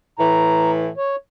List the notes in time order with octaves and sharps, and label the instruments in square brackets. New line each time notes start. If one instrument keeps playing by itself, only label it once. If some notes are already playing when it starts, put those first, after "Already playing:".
[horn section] A2 E3 [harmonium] A#5
[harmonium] C#5